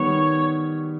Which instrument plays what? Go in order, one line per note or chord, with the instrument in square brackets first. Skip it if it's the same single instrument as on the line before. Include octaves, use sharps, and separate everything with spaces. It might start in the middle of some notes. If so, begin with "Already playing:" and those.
Already playing: [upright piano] D#3 G3 B3 [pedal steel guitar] C#5